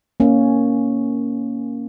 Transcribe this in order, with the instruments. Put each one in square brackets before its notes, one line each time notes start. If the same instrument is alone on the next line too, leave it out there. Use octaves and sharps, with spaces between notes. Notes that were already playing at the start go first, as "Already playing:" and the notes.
[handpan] A#3 C#4